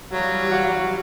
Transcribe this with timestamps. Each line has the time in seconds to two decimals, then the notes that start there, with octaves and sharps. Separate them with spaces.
0.11 E3 F#3 G3 F5
0.51 F#4